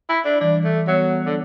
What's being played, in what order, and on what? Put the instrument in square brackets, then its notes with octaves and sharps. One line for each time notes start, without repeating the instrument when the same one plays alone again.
[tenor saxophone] E4
D4
[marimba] E3 G3 [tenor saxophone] D4
[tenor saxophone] A3
[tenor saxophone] F#3 [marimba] G3 B3
[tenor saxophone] D3